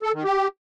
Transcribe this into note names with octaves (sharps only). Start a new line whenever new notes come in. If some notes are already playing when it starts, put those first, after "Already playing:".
A4
D#3
G4